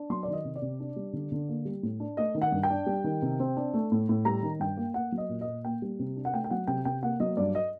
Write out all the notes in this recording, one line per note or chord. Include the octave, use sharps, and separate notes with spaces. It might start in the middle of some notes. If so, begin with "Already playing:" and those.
Already playing: D4
F#3 C6
D5
D#3 D#5
C3
D5
C3
D4
G3
D3
D3
A#3
G3
A2
D4
A3 D#5
D#3
F#5
G2
G5
D4
G3
D#3
C3
C4
D4
A3
A2
A2
G3 A#5
D#3
G2 G5
A#3
A#3 F#5
F#3
D#5
A#2
D#5
A#2
A#3 G5
G3
C3
D4
F#5
A3 G5
G5
F#3 F#5
C3 G5
C3 G5
A#3 F#5
F#3 D#5
G2 D5
D#5